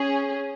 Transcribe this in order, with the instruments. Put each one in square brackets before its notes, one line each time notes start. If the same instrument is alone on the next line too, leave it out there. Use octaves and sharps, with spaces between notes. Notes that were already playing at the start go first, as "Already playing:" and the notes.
Already playing: [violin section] C#4 G#4